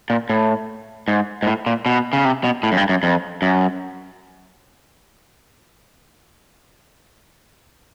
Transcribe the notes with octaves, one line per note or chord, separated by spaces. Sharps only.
A#2
A2
G#2
G#2
A2
A#2
B2
C#3
C3
B2
A2
F#2
G2
F#2
F2
F#2